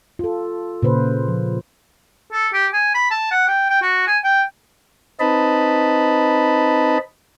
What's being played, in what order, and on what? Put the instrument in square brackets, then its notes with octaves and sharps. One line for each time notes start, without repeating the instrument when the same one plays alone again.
[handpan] F4 A4
A#2 C#3 B4 C5
F3
[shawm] A4
G4
G#5
B5
A5
F#5
G5
G5
F#4
G#5
G5
[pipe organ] C4 D#4 B4 D#5 A5 B5